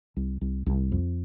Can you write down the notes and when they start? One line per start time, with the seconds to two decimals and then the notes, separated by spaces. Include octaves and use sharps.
0.16 C2
0.41 C2
0.66 C2
0.92 F2